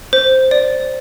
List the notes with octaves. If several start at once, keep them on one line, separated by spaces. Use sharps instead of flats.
C5
D5